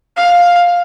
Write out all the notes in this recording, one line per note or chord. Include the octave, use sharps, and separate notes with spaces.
F5